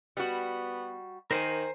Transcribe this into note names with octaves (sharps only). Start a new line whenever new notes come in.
G3 B3 F#4
D#3 A#4 C5 G#5